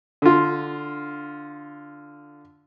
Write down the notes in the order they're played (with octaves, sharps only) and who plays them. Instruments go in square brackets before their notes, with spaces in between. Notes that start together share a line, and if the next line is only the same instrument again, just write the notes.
[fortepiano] D3 F4